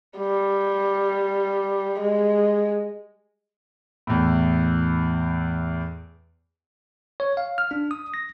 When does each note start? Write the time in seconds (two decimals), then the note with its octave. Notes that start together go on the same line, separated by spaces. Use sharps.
0.18 G3
2.00 G#3
4.07 E2 A2
7.20 C#5
7.37 F5
7.58 F6
7.71 D4
7.91 D#6
8.14 A#6